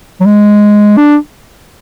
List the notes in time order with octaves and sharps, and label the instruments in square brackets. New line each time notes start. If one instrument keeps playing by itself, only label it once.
[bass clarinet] F#3
G#3
D4